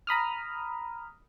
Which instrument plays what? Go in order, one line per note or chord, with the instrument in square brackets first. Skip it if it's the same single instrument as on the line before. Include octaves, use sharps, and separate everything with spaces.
[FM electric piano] A#5 B5 D#6 F6